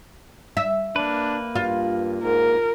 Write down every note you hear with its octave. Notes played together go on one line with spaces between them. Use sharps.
E5
A#3 D4 B4
G2 F4
G#2 A#4